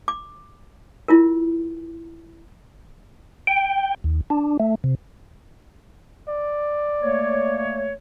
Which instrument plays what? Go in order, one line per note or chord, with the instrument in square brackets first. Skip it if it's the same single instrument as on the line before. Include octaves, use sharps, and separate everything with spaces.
[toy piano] D6
E4 F4 A#4
[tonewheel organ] G5
D#2
D4
A3
C3
[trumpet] D5
[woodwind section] A3 A#3 C#5